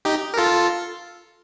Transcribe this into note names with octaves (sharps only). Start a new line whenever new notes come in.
D#4 G4
A#4
F4 A4